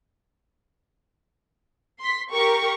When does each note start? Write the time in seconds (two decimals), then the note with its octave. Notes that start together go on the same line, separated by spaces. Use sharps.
2.00 C6 B6
2.32 G4 A#4 C#6